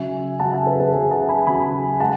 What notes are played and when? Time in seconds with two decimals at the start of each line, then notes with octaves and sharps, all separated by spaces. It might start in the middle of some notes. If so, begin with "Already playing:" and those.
Already playing: C#3 F#3 E5 G#5
0.39 C#3 F#3 F#5 A5
0.53 E5 G#5
0.67 G#4 B4
0.80 G#4 B4
0.93 C#3 F#3 G#4 B4
1.11 F#5 A5
1.29 G#5 B5
1.47 C#3 F#3 G#5 B5
2.00 G#3 F#5 A5